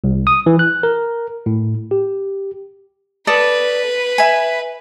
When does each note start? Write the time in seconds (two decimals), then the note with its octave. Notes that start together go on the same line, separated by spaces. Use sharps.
0.04 C2
0.27 D#6
0.46 E3
0.59 F#6
0.83 A#4
1.46 A2
1.91 G4
3.27 A4 B4 D5 D#6
4.18 E5 G#5